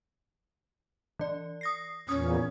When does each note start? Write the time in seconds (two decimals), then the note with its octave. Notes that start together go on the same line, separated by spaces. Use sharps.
1.19 E3 D5
1.61 D#6 A#6 C7
2.09 E2 A#2 C#4 D#6